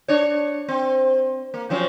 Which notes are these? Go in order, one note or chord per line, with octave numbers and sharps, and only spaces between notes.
D4 C#5
C4
A#3
F3 F#3 C#4